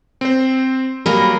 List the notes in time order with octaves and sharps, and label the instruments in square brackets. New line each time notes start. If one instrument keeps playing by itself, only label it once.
[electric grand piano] C4 C5
[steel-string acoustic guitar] F#3 A#3 G#4 [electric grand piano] G3 [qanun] A#4 [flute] B5